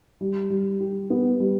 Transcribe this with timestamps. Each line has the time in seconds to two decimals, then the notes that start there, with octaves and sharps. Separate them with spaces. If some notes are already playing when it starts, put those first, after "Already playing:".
0.21 G3
0.50 G3
0.80 G4
1.10 B3
1.40 G3